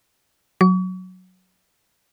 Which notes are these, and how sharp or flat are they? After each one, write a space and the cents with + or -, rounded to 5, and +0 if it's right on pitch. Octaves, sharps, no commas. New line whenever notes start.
F#3 -5 C#6 +40